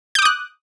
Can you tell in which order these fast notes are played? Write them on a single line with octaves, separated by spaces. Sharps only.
G6 D6 D#6 F#6